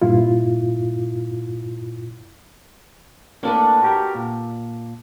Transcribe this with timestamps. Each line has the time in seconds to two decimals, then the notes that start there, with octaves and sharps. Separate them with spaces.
0.02 G2 A#2 E4 F4
3.43 A2 A#3 D4 A4 B4
3.82 F#4 G4 A#4
4.15 A#2